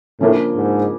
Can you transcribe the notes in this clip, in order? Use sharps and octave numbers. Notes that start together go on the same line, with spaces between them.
A2 C#3 F3 A#3 D4
G#2